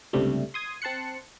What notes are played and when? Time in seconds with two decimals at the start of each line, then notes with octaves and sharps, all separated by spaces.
0.13 C#2 G2 C3 G3 A3
0.54 C6 D#6 G#6
0.82 C4 A5 C6 F#6 C#7